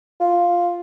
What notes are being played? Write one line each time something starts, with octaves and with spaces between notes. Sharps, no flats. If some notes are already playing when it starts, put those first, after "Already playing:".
F4